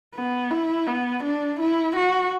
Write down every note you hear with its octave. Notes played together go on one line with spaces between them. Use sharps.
B3
E4
B3
D4
E4
F#4